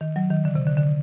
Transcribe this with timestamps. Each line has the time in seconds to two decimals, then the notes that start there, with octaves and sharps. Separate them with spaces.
0.01 D#3
0.16 F#3
0.30 D#3
0.45 D3
0.55 C3
0.67 D3
0.77 D3